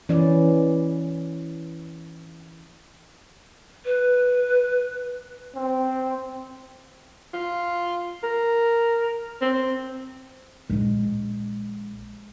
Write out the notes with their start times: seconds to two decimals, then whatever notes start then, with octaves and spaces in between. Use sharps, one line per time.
0.09 E3 C#4 B4 D5
3.85 B4
5.55 C4
7.34 F4
8.23 A#4
9.41 C4
10.70 A#1 G#3